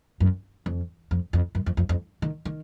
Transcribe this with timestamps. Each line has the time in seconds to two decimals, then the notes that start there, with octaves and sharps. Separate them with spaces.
0.20 F#2
0.66 F2
1.11 F2
1.33 F2
1.55 F#2
1.66 F2
1.77 F2
1.89 F2
2.22 D#3
2.45 D#3